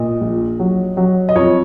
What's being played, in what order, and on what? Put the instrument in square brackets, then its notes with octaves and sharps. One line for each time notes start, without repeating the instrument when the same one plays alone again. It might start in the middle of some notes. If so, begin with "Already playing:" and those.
Already playing: [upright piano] A#2 D#5
A#1
F#3
F#3
D#5
F2 C#5